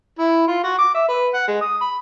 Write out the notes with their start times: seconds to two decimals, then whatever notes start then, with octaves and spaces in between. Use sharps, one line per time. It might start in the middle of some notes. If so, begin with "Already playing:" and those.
0.19 E4
0.47 F4
0.64 F#4
0.78 D6
0.94 E5
1.08 B4
1.34 F#5
1.48 G#3
1.61 D#6
1.81 B5